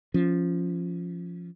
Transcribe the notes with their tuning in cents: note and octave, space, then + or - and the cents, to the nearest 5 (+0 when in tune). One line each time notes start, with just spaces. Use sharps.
F3 -5 C#4 +0